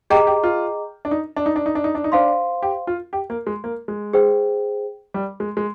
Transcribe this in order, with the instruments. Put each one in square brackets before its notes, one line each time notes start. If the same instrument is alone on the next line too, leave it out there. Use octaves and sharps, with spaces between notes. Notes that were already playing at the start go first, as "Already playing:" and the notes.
[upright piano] G4 [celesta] G#4 D#5 G5 A#5 D6
[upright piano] G4
F4
D4
D#4
D4
D#4
D4
D#4
D4
D#4
D4
D#4
[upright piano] D4 [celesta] C5 F5 C6
[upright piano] G4
F4
G4
A#3
G#3
A#3
G#3
[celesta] G#4 C5 G5
[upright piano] G3
G#3
G#3